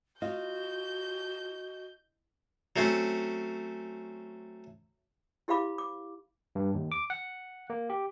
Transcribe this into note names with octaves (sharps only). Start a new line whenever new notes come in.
F4 F#4 D#5 G6
F#3 A3 C4 C#4
E4 G4 C5 F5 B5 D6
D6
G2
D#2
D6
F#5
A#3
G4